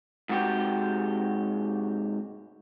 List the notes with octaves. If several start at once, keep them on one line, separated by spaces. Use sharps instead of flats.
G#2 C3 F#4 G4